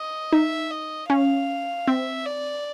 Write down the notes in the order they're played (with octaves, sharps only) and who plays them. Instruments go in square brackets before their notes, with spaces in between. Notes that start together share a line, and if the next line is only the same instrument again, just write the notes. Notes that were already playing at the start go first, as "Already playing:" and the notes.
Already playing: [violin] D#5
[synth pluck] D#4 [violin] E5
[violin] D#5
[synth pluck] C#4 [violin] F5
[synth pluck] C4 [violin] E5
[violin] D5